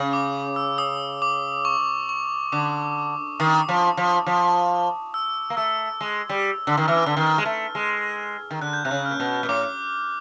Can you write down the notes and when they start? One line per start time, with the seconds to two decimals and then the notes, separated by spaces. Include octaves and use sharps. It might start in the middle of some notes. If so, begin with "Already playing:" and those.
Already playing: C#3
0.13 D6
0.56 E6
0.78 D#6
1.22 D6
1.65 C#6
2.09 C#6
2.52 D3 D6
3.40 D#3 D#6
3.69 F3
3.97 F3
4.26 F3
5.14 E6
5.50 A#3
5.57 A3 E6
6.01 G#3
6.29 G3
6.67 D3
6.77 D#3
6.88 E3 F6
7.06 D3
7.17 D#3
7.38 G#3
7.45 A3
7.75 G#3
8.51 D#3
8.61 D3 F#6
8.73 G6
8.85 C3 F#6
8.91 C#3
9.06 F6
9.11 A#2
9.20 B2
9.43 A#2
9.49 A2 D6